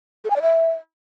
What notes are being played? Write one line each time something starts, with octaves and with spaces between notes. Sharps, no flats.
A4
G#5
D5
E5